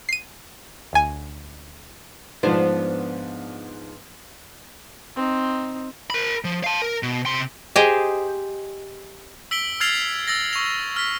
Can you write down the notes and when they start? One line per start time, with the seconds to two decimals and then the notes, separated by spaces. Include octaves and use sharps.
0.09 C7 D#7
0.93 D2 G#5
2.43 G#2 F3 B3 D4 C5
5.16 C4 D#4
6.10 A#4 B5
6.44 F3
6.64 F5 A5
6.82 A#4
7.03 B2
7.26 C3 C6
7.76 G4 G#4 C5 D#5
9.51 E6 B6 D7 G7
9.80 E6 F6 G#6 A6 C7 F7
10.28 E6 A6 A#6
10.53 C#6 F7
10.96 F6 B6